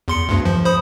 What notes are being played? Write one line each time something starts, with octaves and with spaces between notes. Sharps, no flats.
E2 C6 C#7
D2 G2
F3
C5 B5 D#6